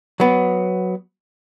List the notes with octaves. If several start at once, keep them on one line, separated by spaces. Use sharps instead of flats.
F#3 B3